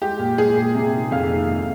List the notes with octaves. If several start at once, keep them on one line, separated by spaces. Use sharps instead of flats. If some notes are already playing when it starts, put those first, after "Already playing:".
G#3 G4
A#2
G#3 G#4
A#2
C3
D#3
F2 F5
D#3
G#2